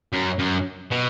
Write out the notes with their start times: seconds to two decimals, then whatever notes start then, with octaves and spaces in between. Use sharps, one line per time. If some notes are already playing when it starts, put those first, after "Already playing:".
0.13 F#2
0.39 F#2
0.91 B2